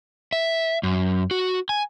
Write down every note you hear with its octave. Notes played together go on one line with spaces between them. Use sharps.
E5
F#2
F#4
G#5